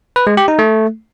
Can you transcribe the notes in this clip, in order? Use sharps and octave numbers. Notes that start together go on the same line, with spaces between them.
B4
G#3
G4
D#4
A3